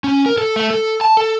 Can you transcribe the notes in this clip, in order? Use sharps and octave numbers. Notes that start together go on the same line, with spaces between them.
C#4
A#4
A4
A3
A4
A5
A4